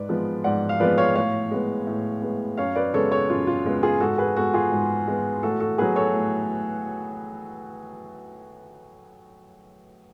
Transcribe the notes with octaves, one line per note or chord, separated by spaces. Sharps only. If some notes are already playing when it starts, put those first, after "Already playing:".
Already playing: G#2 B4 D5
F3 G#3 B3
G#2 D5 F#5
F5
F3 G#3 B3 B4 D5
C#5 F5
A2 C#5 F5
G#3 B3
A2
G#3 B3
F#2 C#5 F5
B4 D5
C#3 G#3 B3 A4 C#5
A4 C#5
F#2 F4
F4
C#3 G#3 B3
F4 G#4
G#2 F#4 A4
G#4 B4
G#3 B3 F#4 A4
F4 G#4
G#2
G#3 B3
A2 F#4 A4
F#4 A4
F#3 B3 G#4 B4
A4 C#5
A2